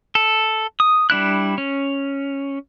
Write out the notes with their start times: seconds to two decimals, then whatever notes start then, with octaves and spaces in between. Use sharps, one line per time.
0.15 A4
0.80 D#6
1.10 G3 D4 E4 F#6
1.58 C#4